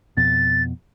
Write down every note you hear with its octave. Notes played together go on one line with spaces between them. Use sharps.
F2 B2 A6